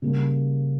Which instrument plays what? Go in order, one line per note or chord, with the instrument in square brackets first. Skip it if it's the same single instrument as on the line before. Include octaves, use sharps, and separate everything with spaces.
[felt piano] C#3 G3 A#3